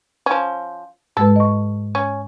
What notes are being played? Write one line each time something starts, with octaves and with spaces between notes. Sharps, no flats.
F3 C#4
G#2 G#3 A4 B4
D#5 C#6
C#4